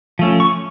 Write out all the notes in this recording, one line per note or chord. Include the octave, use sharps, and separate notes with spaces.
F3 A3 C#4
C#6